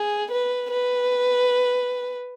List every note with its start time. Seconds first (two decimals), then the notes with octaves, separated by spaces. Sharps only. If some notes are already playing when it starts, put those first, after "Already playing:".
Already playing: G#4
0.32 B4
0.71 B4